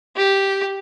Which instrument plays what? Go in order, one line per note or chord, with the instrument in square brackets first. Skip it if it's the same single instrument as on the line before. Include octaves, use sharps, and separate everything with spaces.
[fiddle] G4